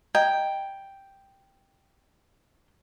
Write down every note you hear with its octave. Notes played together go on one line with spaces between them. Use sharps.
D#5 G5 A#5 G#6